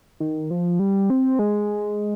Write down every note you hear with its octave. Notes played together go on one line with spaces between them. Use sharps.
D#3
F3
G3
C4
G#3